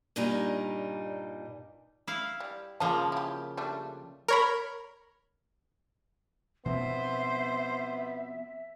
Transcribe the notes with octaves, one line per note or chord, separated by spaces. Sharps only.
G2 A#2 G3 D#4 A#5
E4 F5
G3
C#3 F3 A#3 F4 A5
E4 G4
G3 A3 D4
A#4 C#5 B5
B2 F3 B3 C4 C5 E5